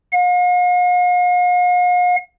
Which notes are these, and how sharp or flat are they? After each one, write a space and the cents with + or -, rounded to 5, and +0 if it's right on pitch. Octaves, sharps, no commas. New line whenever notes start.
F5 +45